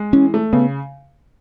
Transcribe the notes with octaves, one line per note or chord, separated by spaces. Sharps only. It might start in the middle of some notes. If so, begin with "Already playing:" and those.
Already playing: G#3
E3 C#4
A3
C#3 B3